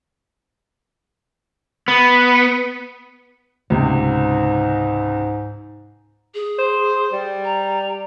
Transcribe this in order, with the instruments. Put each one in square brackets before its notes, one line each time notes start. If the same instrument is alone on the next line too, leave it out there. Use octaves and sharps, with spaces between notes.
[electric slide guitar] B3
[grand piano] C#2 C3 [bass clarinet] G#2
[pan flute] G#4
[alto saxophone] C5
G3
[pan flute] A#5